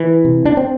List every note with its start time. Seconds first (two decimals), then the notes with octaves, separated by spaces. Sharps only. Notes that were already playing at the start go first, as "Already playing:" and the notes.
Already playing: E3
0.25 C3
0.45 D4
0.57 C4